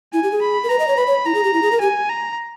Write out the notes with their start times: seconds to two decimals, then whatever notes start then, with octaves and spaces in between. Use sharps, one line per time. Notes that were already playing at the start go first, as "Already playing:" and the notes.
0.13 E4 G#5
0.23 G4
0.32 G#4
0.42 B5
0.64 A#4
0.69 B4 A#5
0.79 D#5
0.88 C#5
0.97 B4 B5
1.07 C#5
1.25 E4 A#5
1.35 G#4
1.44 G4
1.54 E4
1.62 G#4
1.72 A#4
1.81 G4 G#5
2.10 A#5